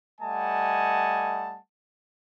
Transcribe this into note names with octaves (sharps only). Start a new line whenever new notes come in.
G3 A3 D#5 F#5 G#5 A5